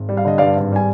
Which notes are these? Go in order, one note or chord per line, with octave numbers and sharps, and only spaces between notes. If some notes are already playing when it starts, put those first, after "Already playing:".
Already playing: G#1
G3
F5
D3 D#5
G2 D5 F5
G#1
G3 G#5